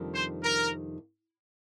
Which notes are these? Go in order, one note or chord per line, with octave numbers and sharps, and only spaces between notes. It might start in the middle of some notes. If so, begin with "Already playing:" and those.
Already playing: F2 C3 D#3 G3 D4
C5
A#4